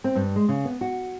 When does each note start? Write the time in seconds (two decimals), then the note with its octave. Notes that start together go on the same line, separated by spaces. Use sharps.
0.04 C4
0.15 G2
0.36 G#3
0.48 C#3
0.65 B3
0.81 F#4